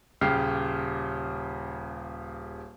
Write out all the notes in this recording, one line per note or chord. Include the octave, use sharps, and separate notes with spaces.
D#1 C#3 G4 F6 C7